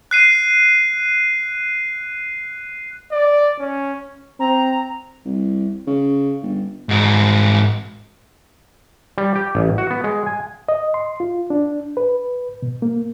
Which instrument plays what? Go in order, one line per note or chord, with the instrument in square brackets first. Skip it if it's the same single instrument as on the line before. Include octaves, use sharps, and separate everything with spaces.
[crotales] F#6 C7 D#7
[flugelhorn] D5
C#4
[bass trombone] C4 [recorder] A#5
[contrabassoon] C2
C#3
G1
[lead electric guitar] G#2 F#4
[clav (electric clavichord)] G3
G4
A1
F#4
B3
G#3
G#5
[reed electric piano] D#5
C6
F4
D4
B4
B2
A#3